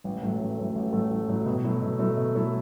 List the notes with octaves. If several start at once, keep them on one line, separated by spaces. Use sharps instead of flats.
A1
A2 F#3 A3
A1
A2 F#3 A3
A1
A2 F#3 A3
A1
A2 F#3 A3
B2
F#3 A3 E4
B2
F#3 A3 E4
B2
F#3 A3 E4